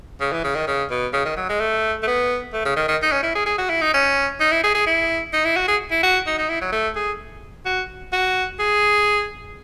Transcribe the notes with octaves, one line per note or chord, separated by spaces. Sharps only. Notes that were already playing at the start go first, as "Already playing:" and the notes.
C#3
E3
C#3
D#3
C#3
B2
C#3
D#3
F#3
G#3
A3
A3
B3
A3
C#3
D#3
D#3
D#4
C#4
E4
G#4
G#4
F#4
E4
D#4
C#4
D#4
E4
G#4
G#4
E4
D#4
E4
F#4
G#4
E4
F#4
D#4
D#4
E4
F#3
A3
G#4
F#4
F#4
G#4